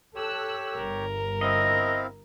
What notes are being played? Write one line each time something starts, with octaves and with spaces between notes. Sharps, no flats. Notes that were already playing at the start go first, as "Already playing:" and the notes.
G4 A4 C#5 E6 F#6
G1 A#4
C4 E4 D#5 F5